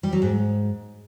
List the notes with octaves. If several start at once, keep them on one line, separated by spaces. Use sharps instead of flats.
G3
F#3
G#2